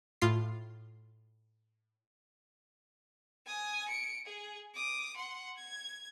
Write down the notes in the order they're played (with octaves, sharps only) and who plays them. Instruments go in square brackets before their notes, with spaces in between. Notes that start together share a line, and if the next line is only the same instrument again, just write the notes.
[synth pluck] A2 F4 C7
[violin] G#5 D#6
C#7 D7
G#4
D6 D#6
F#5 C6
G#6